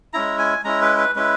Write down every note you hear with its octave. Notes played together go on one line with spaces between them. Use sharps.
G#3 C#4 E4 A#5
G#5
G#3 C#4 E4 A#5
B4
B4
G#3 C#4 E4 B4